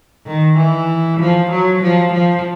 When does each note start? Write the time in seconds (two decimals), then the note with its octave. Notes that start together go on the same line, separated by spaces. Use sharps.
0.26 D#3
0.57 E3
1.20 F3
1.51 F#3
1.82 F3
2.13 F3